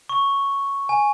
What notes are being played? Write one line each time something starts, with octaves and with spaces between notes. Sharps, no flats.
C#6
G#5